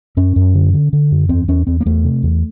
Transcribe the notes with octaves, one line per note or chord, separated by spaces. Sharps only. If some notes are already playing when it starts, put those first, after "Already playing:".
F#2 C#4
F#2
D3
D3
D3
F#2
E2 C4
E2 C#4
E2 C4
A#3
E2 A3
C3
E2